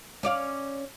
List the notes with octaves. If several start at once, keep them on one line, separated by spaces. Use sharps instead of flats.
C#4 D5 F5